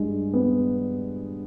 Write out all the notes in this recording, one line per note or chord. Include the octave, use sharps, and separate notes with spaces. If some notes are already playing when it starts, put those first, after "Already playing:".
Already playing: G2 G#3
B3